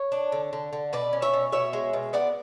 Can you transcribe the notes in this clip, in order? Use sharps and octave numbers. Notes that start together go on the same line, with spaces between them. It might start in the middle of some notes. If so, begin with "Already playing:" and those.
Already playing: C#5
D4
D3
D3
D3
B2 B4 D5
C#4
C#5 E5
B2
B2 C#5 E5
G#3
B2
B3 D5 F#5